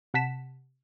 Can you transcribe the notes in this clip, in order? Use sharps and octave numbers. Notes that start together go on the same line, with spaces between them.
C3 F#5 A5 B6 E7